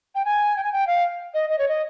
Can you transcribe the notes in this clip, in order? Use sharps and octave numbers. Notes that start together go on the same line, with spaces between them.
G5
G#5
G5
G#5
G5
F5
D#5
D#5
C#5
D#5